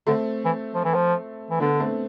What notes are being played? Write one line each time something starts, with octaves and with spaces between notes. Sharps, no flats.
D3 A3 C4
E3
F3
E3
F3
E3
D3 B3 D4
A3 C4